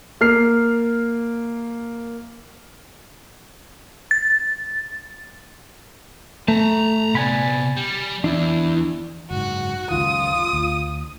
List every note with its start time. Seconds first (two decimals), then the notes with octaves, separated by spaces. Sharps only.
0.21 A#3 F6 C7
4.11 A6
6.48 A3 A5 A#5
7.15 C3 B3 D5 G#5 B5
7.76 G3
8.24 E2 D4 E4
9.31 F#1 G#2 F#4
9.91 C#2 F#2 D#3 F4 D#6
10.53 D2